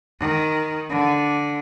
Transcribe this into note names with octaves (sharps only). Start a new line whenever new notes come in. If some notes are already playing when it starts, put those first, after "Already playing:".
D#3
D3